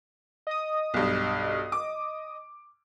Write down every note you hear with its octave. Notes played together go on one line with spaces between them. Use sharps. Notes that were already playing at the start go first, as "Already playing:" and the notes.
D#5 D#6
B1 G2
D6